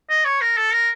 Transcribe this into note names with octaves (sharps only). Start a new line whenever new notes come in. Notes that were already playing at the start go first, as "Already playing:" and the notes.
D#5
C#5
A#4
A4
A#4